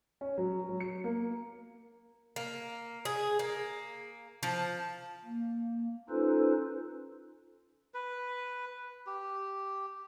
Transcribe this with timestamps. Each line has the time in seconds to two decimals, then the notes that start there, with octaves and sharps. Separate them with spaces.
0.21 C#4
0.38 F#3
0.69 F#3
0.80 C#7
1.04 A#3
2.36 A#3
3.05 G#4
3.39 A#3
4.43 F3
5.24 A#3
6.10 C#4 D#4 F4 A4 B4 C5
7.94 B4
9.07 G4